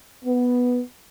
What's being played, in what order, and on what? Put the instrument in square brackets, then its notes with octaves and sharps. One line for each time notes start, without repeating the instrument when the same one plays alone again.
[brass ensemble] B3